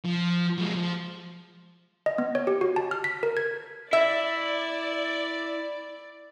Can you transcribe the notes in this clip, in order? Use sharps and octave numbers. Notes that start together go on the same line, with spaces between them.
F3
F#3 G#3
F3
D#5
B3
C#5
G4
F#4
A5
F6
B6
A#4
G#6
E4 D5 E5